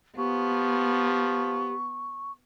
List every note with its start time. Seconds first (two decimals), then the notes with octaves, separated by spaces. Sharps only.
0.18 F3 B3 G4 C#6